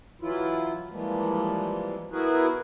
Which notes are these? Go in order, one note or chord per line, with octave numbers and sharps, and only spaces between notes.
E3 F#3 E4 F4
E3 F3 G3 G#3 A#3
B3 E4 F#4 G#4 A#4 B4